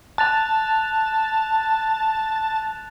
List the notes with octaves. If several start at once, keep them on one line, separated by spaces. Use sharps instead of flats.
A5 F#6 A6 F7